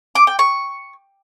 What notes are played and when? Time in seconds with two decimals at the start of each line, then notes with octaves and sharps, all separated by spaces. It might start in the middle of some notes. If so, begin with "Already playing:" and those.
0.15 D6
0.27 G5
0.39 C#6